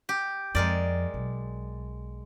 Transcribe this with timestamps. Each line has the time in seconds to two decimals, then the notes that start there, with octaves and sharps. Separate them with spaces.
0.09 G4
0.55 F2 G#3 A#4 D5
1.14 B1